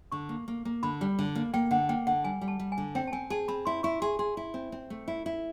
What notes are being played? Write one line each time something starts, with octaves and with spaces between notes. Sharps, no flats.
D3 C#6
A#3
A#3
A#3
D3 B5
G3
D3
A#3
A#3 G5
D3 F#5
A#3 G5
D3 F#5
G3 G#5
G3
A5
G3
G#5
D3
C4 G5
A5
C4 G#5
G#4 A5
C4 B5
E4 C6
E4 C#6
G#4 C6
G#4 C6
E4
C4
C4
A3
E4
E4